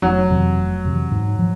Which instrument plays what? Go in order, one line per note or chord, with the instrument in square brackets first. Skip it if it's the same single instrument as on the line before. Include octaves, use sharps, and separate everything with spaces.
[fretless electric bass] F1 [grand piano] F#3
[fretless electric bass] F2 C3 E3
F1
F2 C3 E3
G#2
F3